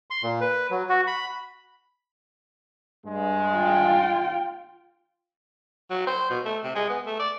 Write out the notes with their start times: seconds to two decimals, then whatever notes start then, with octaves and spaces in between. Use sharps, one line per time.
0.10 C6
0.23 A#2
0.41 B4
0.71 F#3
0.89 F#4
1.07 B5
3.07 G2 G#3
3.58 F4 G5
5.90 F#3
6.07 C5
6.30 B2
6.45 A3
6.64 C3
6.75 G#3
6.89 B3
7.06 A3
7.20 D5